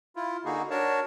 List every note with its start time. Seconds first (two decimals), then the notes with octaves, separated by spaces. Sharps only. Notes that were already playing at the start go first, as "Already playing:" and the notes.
0.16 E4 F4
0.45 D3 A#3 D#4 F#4 G#4
0.70 D4 F#4 A#4 C#5 A5